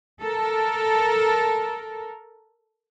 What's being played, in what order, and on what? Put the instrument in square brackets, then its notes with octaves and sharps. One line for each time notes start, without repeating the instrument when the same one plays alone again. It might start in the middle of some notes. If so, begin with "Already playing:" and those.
[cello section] A4 A#4